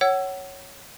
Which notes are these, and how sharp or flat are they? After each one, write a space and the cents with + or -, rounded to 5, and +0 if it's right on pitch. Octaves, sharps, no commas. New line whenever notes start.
C#5 +0 F#5 +30 E6 +20